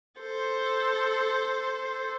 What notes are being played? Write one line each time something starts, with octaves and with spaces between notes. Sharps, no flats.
A4 C5